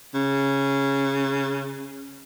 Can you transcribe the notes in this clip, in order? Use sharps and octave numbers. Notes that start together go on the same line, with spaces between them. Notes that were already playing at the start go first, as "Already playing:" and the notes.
C#3